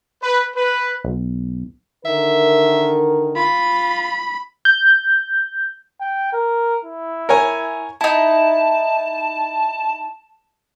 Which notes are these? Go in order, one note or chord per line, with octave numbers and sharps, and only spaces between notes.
B4
B4
B1
D3 D#3 A#4 E5
F4 B5
G6
G5
A#4
E4
A#4 C#5 G#5
D#4 E4 A5